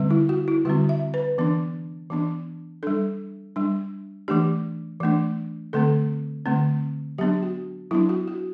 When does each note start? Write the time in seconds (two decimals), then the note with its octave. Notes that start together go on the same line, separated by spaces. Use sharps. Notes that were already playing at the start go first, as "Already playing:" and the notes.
Already playing: D3 G3 C4
0.11 E4
0.29 F#4
0.48 E4
0.65 D3 G3 C4 F#4
0.89 E5
1.14 B4
1.38 E3 B3 D4
2.10 E3 B3 D4
2.83 G3 D4 A4
3.56 G3 D4
4.28 E3 A3 D4 G4
5.00 E3 A3 D4
5.73 D3 A3 C4 A4
6.46 D3 A3 C4
7.18 F#3 B3 D4 G4
7.43 F#4
7.91 F#3 B3 D4 E4
8.09 F#4
8.28 F#4